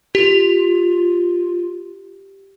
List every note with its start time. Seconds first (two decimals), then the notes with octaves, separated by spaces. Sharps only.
0.15 F4 G4